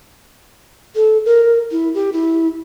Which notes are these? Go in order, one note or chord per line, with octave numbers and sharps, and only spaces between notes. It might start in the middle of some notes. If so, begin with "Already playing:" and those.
A4
A#4
E4
G4
E4